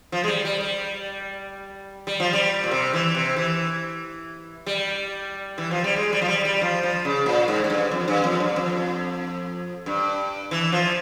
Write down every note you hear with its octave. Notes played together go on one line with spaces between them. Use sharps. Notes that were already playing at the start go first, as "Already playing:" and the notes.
F3
G#3
G3
G3
G3
G3
F3
G3
A#2
C3
E3
C3
E3
G3
E3
F3
G3
G#3
G3
F3
G3
G3
F3
F3
C#3
A#2
G#2
G#2
G2
F2
G2
F2
G2
F2
G2
E3
F3